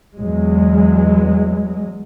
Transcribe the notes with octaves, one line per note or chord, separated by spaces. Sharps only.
E2 F#3 G#3